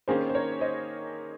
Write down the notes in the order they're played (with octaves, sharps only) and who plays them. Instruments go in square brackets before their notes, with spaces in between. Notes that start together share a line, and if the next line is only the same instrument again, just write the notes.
[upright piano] D#3 A#3 C#4 [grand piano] G#4 C5
[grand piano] C5
A#4 C#5
C5 D#5